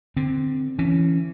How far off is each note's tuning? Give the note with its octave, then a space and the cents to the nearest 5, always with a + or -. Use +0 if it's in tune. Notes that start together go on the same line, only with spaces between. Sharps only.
D3 +15 C4 +0
E3 +15 C#4 +0